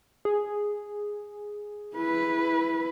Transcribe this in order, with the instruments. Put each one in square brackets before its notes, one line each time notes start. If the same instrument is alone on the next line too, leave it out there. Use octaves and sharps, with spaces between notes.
[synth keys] G#4
[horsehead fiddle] E4 B4